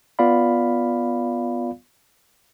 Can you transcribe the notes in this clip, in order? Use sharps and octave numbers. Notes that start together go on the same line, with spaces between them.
B3 F4 D5 F5 B5